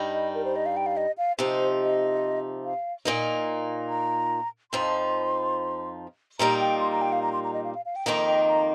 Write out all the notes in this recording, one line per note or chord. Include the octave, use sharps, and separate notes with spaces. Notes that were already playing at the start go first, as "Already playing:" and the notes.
Already playing: G2 G3 D#4
D#5
A#4
C5
D#5
F5
G5
F5
D#5
F5
C3 F3 D#4 C5
D#5
F5
A#2 A#3 D#4
A#5
F2 F3 D#4 C6
A#2 G3 A#3 D#4 A#5
G5
C6
A#5
G5
F5
A#5
C6
A#5
D#5
F5
F5
F5
G5
F2 D#3 A#3 D#4 D#5
G5
A#5